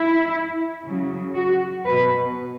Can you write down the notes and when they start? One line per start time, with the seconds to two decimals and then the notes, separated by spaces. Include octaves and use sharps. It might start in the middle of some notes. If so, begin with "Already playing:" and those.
Already playing: E4
0.85 C#3 F#3
1.35 F#4
1.85 B2 F#3 B4